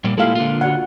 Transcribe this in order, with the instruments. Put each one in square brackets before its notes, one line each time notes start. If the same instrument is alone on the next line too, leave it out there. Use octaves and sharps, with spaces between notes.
[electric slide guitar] A#2 G3 A#3
[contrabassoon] A#2 [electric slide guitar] G#3 E4 G4 [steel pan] A4 F5
[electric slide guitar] D3 F4
[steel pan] F#4 D5 F#5